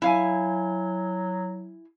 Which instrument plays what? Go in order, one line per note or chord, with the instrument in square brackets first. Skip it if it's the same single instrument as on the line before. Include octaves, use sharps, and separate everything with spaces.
[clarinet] F#3 [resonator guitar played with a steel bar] E4 F5 G#5